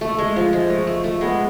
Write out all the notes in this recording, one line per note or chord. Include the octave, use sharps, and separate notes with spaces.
A3
G#3
F3
G#3
A3
A3
A3
G#3 B3